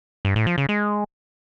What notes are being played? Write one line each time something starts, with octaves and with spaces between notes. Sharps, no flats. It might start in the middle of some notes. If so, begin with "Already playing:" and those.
G2
A2
F3
C#3
G#3